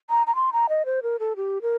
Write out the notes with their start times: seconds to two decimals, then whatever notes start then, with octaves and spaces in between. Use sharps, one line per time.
0.10 A#5
0.27 A#5
0.35 C6
0.53 A#5
0.69 D#5
0.86 C5
1.03 A#4
1.20 A4
1.36 G4
1.62 A#4